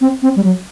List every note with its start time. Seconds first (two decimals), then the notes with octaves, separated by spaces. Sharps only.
0.01 C4
0.22 C4
0.36 G3
0.44 F#3